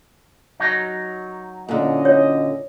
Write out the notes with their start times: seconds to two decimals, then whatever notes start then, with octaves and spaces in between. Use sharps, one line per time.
0.60 F#3 D#4
1.69 A#2 D3 C#4 E4 D#5
2.05 C#5